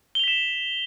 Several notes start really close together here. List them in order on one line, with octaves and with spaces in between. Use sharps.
G7 F7 B6 E7